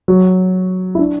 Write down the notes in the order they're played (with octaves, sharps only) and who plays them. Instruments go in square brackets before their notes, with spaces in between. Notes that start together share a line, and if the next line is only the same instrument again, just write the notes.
[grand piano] F#3
E4
D4